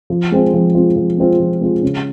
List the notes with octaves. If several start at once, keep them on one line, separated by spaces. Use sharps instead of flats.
F3
G#3 C4 F4
F3
G#3 C4 F4
F3
G#3 C4 F4
F3
G#3 C4 F4
C#3